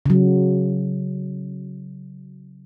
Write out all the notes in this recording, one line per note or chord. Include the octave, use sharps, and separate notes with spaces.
C#3 F#3